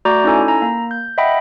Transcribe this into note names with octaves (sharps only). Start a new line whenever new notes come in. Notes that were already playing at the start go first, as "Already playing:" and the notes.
A3 F#4 D5 A#5 D6 G6
C#4 D#4 E4 A4 G#5
A#5
A#3
G6
D#5 E5 F#5 G5 B5